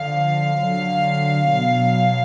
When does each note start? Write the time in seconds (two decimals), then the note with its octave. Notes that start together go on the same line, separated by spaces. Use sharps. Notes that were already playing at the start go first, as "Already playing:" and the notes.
Already playing: D3 F3 F5
0.57 D3 F#3
1.47 B2 F#3